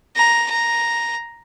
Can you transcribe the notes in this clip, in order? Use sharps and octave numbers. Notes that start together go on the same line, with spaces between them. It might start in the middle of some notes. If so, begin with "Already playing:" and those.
A#5
A#5